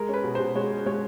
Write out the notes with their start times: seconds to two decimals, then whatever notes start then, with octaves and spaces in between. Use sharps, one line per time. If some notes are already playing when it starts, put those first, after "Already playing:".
Already playing: G#3 A#4
0.09 C#4 B4
0.24 B2
0.35 B2 C5
0.55 G#3 C#5
0.71 C#4
0.86 G#3 C#5